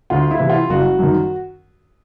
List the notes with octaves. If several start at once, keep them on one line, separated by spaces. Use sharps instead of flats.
D2 F4
E4
C3 E3
F4
F#1 F#4
F#2 D#3